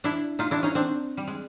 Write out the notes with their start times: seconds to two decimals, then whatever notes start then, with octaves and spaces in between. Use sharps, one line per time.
0.04 D4 E4
0.39 D#4 F4
0.51 D4 E4
0.63 C#4 D#4
0.75 C4 D4
1.17 G3
1.27 G#3